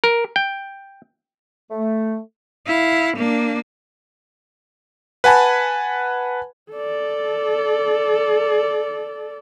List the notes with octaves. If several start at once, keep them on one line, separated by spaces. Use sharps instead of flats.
A#4
G5
A3
E4 F5
A#3 D4
B4 F#5 G#5 A5 B5
A4 D5